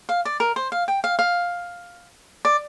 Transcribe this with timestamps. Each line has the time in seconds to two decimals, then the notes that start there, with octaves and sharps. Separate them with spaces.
0.09 F5
0.25 D5
0.40 A#4
0.56 C5
0.72 F5
0.88 G5
1.04 F5
1.19 F5
2.45 D5